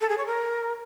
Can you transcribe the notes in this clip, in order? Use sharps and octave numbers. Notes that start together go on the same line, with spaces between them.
A4
G#4
C#5
A#4